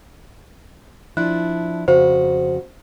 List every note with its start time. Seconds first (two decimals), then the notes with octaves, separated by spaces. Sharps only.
1.17 F3 D4 E4 F#6
1.88 F2 C#3 F#4 C5